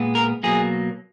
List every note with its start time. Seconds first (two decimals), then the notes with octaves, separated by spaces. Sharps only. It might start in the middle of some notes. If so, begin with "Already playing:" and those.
Already playing: A#2 G#3 B3
0.15 A#4
0.43 B2 F#3 A#3 G#4